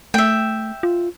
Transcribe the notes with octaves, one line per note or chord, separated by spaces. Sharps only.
A3 E5 G5
F4